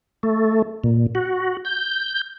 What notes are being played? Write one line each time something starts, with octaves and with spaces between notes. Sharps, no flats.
A3
A#2
F#4
G6